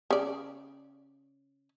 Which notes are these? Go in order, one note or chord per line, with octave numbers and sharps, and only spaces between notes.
C#3 D5